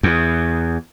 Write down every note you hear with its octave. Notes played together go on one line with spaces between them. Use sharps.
E2